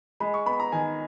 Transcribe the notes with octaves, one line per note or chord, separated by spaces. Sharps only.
G#3 B5
C#6
B3 B5
A#5
D#3 G#5